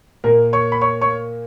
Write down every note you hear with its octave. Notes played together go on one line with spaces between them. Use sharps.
A#2 A#3 A#4 A#5
C#5 C#6
B5
C#5 C#6
C#5 C#6